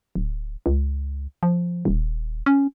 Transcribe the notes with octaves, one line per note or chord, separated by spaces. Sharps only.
D1
C#2
F3
D#1
C#4